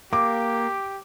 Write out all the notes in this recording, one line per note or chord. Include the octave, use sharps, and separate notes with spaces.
A#3 G4 D6